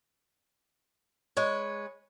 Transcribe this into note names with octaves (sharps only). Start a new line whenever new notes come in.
G#3 B4 C#5